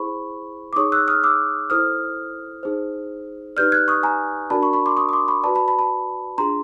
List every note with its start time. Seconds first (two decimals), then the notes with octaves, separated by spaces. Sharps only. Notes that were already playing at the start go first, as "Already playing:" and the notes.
Already playing: E4 G#4 C5 B5 C#6
0.73 D6
0.76 D#4 G#4 C#5 C#6 D#6
0.92 E6 F#6
1.08 D#6 F6
1.24 D6 E6
1.70 E4 A4 C5 D#6 F6
2.63 D#4 G#4 C5
3.57 D#4 G4 B4 D5 F6 G6
3.72 F#6 G#6
3.88 C#6 D#6
4.03 G#5 A#5
4.50 D4 F#4 A#4 D5 A5 B5
4.62 B5 C#6
4.73 B5 C#6
4.86 C6 D6
4.97 C#6 D#6
5.09 D#6
5.13 C6 D6
5.28 B5 C#6
5.43 F#4 B4 D5 A5 B5
5.55 A5 B5
5.68 A5 B5
5.79 A5 B5
6.38 D4 F4 G#4 A#5 C6